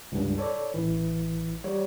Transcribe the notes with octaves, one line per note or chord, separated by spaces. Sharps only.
C#2 G2
A4 C#5 D5
A1 E3
G3 C#5